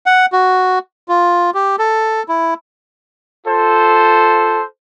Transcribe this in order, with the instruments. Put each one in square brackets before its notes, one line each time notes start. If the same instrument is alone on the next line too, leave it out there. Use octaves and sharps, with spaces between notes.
[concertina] F#5
F#4
F4
G4
A4
E4
[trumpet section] F4 A4 C5